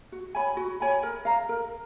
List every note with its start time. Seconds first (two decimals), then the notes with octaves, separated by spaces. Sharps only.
0.12 F#4
0.35 C#5 G#5 B5
0.57 F#4
0.80 C#5 G#5 B5
1.03 A#4
1.25 F5 A#5
1.49 A#4